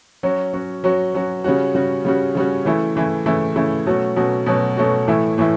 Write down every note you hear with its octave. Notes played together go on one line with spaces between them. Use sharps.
F#3 C#4 F#4
F#3 C#4 F#4
F#3 C#4 F#4
F#3 C#4 F#4
C#3 G3 C#4 F#4
C#3 G3 C#4 F#4
C#3 G3 C#4 F#4
C#3 G3 C#4 F#4
C#3 E3 A3 E4
C#3 E3 A3 E4
C#3 E3 A3 E4
C#3 E3 A3 E4
B2 F#3 A3 C#4 F#4
B2 F#3 A3 C#4 F#4
B2 F#3 A3 C#4 F#4
B2 F#3 A3 C#4 F#4
A2 E3 A3 E4
A2 E3 A3 E4